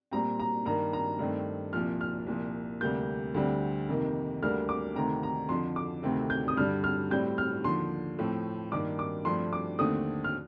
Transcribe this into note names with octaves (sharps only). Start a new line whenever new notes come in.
A#2 G3 C4 A#5
A#5
G2 D#3 A#3 A#5
A#5
G2 D#3 A3 C4
C2 A#2 F3 F6
F6
C2 A#2 F3
D2 C3 G3 A#3 G6
D2 D3 G3 C4
F2 C3 D#3 A#3
D2 D3 G3 A#3 F6
D6
D2 C3 D#3 A3 C4 A#5
A#5
F2 D3 F3 C6
D6
D2 C3 D#3 A3 C4
G6
D#6
G2 D3 G3 F6
F6
A2 G3 C4 G6
F6
D#2 D3 F3 C6
A2 F3 A3 C4
G2 D#3 A#3 D6
D6
G2 F3 A3 C4 C6
D6
D#2 D3 A3 C4 D#6
F6